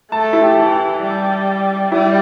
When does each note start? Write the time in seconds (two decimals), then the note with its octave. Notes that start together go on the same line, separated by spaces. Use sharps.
0.12 A3 A5
0.33 E4
0.42 G4
0.57 E3
1.02 G3
1.91 G3 E4